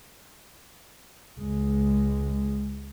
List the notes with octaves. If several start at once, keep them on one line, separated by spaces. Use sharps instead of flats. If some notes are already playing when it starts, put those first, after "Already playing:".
C#2 G#3